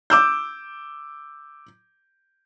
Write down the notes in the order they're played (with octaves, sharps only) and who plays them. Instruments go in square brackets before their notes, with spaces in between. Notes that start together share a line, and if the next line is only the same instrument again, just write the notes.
[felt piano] D6 E6 G6